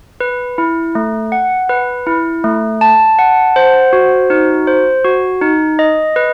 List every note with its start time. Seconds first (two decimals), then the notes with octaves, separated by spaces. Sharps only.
0.20 B4
0.58 E4
0.95 A3
1.32 F#5
1.69 B4
2.07 E4
2.44 A3
2.81 A5
3.19 F#5
3.56 C5
3.93 F#4
4.30 D#4
4.67 C5
5.05 F#4
5.42 D#4
5.79 D#5
6.16 B4